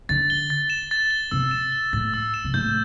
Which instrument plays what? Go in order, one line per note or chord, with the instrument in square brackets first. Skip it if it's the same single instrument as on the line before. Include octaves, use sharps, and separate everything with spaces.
[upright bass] D3 [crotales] A6
[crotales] G7
A6
E7
A6
G7
[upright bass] C3 [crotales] E6
[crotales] E7
G7
[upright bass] A2 [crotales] A6
[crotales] E6
E7
[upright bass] C3
[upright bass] A2 [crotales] G6